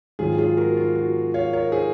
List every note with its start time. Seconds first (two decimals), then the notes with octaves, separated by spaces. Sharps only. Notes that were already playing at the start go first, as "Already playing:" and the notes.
0.19 G#2 D#3 F#3 F4 G#4
0.38 F4 G#4
0.57 F#4 A#4
0.77 F4
0.95 F#4
1.34 C#5 F5
1.53 A#4 C#5
1.72 G#4 C5